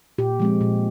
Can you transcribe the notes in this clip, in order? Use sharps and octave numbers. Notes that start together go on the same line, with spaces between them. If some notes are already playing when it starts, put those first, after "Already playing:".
A#2 G4
F3 G#3 C4
A#2